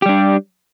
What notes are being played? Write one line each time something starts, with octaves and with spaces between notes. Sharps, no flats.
G3 D4 G4